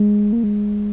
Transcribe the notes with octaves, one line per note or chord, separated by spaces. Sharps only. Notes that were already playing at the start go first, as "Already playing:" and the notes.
Already playing: G#3
A#3
G#3